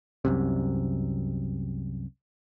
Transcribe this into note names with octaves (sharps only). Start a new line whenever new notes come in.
C2 F#2 C3